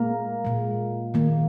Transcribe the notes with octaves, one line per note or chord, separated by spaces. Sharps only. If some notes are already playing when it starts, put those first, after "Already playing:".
Already playing: A#2 G#3 A#3 A#4
A#2 G#3
D#3 A#3